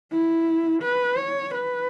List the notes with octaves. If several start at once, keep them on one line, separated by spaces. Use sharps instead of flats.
E4
B4
C#5
B4